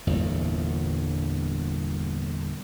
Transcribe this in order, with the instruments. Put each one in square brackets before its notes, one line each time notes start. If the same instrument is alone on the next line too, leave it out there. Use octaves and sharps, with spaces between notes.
[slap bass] G1 E2 G2 A#2